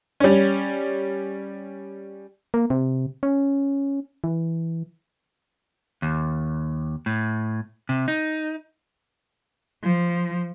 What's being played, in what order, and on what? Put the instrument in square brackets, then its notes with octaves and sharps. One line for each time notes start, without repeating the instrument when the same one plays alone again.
[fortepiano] G3 C#4
[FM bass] A#3
C3
C#4
E3
[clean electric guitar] D#2
A2
C3
D#4
[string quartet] F3